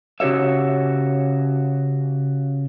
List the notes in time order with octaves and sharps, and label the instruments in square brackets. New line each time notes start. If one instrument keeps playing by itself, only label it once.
[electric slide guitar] C#3 F#4 G4 C#5 E5